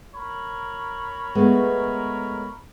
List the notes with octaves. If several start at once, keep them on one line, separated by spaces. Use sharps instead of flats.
A#4 C#5 B5
G#3 A3 B3